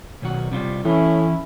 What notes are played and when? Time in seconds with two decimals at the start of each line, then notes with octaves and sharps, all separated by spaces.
0.22 B1 D#3 F#4
0.51 C3 G3 F4
0.85 A2 E3 C#4 E4